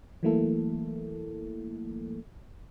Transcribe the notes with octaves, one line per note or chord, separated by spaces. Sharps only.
E3 F#3 A3 A#3 E4 A4